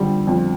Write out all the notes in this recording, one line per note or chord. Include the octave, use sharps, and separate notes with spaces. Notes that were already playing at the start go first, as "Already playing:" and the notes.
Already playing: F2 D3 G3
F2